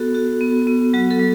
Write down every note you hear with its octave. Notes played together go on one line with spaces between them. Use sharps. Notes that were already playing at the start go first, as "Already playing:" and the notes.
Already playing: B3 F#4 A4
F#4
B3
B3
F#3 F#4
A4
F#3